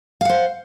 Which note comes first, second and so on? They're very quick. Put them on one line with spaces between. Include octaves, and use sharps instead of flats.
F5 F#5 C5